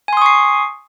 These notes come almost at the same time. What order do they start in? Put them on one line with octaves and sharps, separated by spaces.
G#5 C6 D#6 C#6 C7